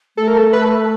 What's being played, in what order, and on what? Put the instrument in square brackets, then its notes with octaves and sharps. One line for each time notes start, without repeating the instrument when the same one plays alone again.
[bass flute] A3 [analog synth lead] A4
[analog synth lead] A#4
A4
B4